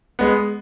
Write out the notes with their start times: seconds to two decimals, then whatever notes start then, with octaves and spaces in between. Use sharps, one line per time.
0.19 G#3 B3